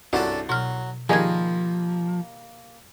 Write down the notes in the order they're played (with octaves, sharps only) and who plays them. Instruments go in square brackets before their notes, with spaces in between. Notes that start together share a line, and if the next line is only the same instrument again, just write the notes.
[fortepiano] C2 G2 F#4 [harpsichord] C#4 D4 A4
[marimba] B2 F6 [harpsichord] F#3
[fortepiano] D#3 G3 G#4 [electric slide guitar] F3 [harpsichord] A#3 [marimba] G#5 G#6